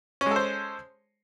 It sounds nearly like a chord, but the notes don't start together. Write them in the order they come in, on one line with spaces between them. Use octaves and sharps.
C#4 G#3 A4 C5